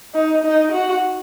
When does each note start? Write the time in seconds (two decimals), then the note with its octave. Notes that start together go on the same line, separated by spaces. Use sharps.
0.14 D#4
0.44 D#4
0.72 F#4